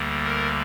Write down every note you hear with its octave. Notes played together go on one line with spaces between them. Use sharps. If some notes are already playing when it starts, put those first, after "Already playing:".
Already playing: D2 D3 G3 A#3
A#4